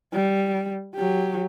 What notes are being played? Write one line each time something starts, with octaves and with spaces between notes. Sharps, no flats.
G3
F#3 G4